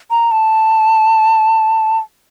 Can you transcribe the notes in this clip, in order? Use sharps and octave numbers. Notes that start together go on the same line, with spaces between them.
A#5
A5